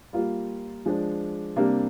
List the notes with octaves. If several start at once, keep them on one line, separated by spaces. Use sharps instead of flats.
G3 A#3 F4
F3 G#3 D4
C3 G3 A#3 D4